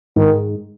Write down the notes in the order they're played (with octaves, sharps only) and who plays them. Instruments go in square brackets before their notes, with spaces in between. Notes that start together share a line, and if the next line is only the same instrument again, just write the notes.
[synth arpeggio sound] G#2 [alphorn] D#3